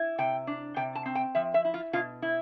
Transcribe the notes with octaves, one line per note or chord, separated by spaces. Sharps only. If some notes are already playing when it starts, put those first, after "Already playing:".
Already playing: E4
C3 G5
D4
C3 G5
A5
C4
G5
F3 E5
E5
E4
F4
B2 F4
E4